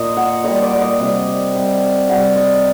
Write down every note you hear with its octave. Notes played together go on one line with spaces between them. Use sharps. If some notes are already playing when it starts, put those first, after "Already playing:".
Already playing: A#2 D#5
F#5
A#2 G3 D#5
D5
F#5
D#5
C3 G3
C3 G3
C3 G3 F#5
D#5